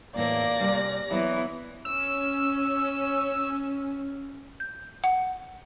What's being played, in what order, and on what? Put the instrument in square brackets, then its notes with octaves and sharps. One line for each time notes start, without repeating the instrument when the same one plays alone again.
[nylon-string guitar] E2 A2 E3 [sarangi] A#3 [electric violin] D5 A#6
[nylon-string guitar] C3 G3 G#5
[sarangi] E3 [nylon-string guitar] F#3 B3
[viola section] C#4 [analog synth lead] E6
[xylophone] G6
F#5